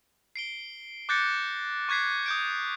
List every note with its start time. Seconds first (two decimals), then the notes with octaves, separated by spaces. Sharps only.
0.36 C7 D7 G7
1.09 D6 F#6 G6 A6 A#6 C#7
1.89 C#6 F#6 G#6 B6 C7
2.26 D#6 G6 D7